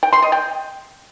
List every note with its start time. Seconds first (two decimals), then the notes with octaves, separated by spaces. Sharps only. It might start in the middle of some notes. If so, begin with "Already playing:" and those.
0.03 G5
0.13 C6
0.22 D#5
0.32 G5